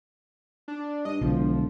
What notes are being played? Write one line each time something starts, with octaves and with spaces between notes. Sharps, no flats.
D4
G2 D#5
E1 B1 D3 F3